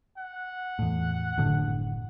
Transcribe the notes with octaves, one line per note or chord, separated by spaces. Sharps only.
F#5
E2 A2
F#1 A2 D3